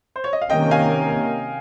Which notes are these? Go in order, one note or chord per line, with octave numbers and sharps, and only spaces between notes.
C5
C#5
D#5
F5
C3 D#3 A#3 C#4 D#5 G5
F5 G#5